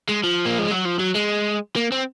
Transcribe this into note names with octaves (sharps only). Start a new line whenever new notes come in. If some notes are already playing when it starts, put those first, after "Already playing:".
G#3
F3
A#3
G#3
F#3
F3
F#3
G#3
A#3
C4